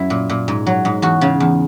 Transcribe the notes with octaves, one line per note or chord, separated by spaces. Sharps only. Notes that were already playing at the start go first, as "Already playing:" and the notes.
Already playing: F#2 E4
A#2
A#2
G#2
F#3
G#2
E2 F#4
C#3
E2